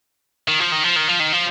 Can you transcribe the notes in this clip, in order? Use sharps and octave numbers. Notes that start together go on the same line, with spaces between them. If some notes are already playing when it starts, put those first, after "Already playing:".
D#3
F3
D#3
F3
D#3
F3
D#3
F3